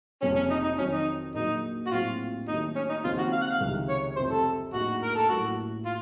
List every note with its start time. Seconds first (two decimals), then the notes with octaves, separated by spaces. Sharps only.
0.22 F#1 F2 C3 F3 C#4
0.36 C#4
0.51 D#4
0.64 D#4
0.78 F2 D#3 F#3 C#4
0.93 D#4
1.34 A#1 A#2 F#3 D#4
1.87 F#4
1.91 A#1 A2 F#3 C4 F4
2.47 D#2 D#3 F#3 A3 D#4
2.76 C#4
2.90 D#4
3.04 D#2 C#3 F3 C4 D#4 F4
3.19 F#4
3.33 F5
3.42 F#5
3.51 F5
3.61 C#2 C3 D#3
3.89 C#5
4.16 F1 F2 C3 C5
4.31 A4
4.73 A#1 A2 A3 D#4 F#4
5.03 A#4
5.16 A4
5.29 A1 A2 F#3 A#3 F#4
5.86 F4